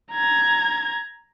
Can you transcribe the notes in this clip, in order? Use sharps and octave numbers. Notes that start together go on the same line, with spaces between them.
A#5 G#6